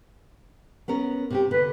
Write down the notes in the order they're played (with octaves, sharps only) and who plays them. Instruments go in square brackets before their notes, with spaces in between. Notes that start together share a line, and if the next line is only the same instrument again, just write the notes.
[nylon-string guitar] B3 C#4 A#4
C3 F#4 G4
[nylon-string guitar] D3 [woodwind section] B4